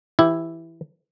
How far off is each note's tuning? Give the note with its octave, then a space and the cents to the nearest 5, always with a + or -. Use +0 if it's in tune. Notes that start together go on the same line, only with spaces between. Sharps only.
E3 +0 E4 +0 G4 +0